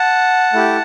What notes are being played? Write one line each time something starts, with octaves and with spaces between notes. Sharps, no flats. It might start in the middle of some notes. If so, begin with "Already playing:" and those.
Already playing: F#5 A5
A3 E4 G4